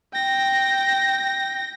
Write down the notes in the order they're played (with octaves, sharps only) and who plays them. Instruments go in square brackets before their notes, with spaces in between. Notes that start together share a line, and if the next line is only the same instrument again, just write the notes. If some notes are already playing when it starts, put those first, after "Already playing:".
[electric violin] G5 A#6